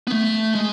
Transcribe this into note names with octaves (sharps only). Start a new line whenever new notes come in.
B3
A3
G#3